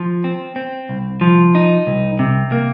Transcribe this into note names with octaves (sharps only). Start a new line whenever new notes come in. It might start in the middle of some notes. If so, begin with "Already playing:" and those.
Already playing: F3
C4
C4
C2
F3
D#4
C2
C3
A#3